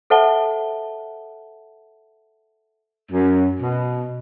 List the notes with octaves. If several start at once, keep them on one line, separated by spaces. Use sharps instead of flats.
A4 C5 E5 F#5 A5 G7
F#2
B2